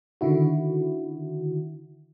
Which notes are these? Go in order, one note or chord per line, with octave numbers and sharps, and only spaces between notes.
D3 D#3 E4 F#4